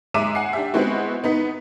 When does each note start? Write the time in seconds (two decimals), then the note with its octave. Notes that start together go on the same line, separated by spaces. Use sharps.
0.14 G#3 E5 A#5 D6 D#7 E7
0.35 F#5 G#5 C7
0.53 D4 G4 E5
0.74 G#3 B3 C4 E4 F#4
1.24 B3 D#4 B6